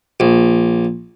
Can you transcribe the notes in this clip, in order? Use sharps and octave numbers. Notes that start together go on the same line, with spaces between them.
A#1